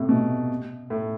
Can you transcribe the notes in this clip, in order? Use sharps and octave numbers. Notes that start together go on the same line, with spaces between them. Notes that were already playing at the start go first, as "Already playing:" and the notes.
Already playing: A2 C3
B2
A2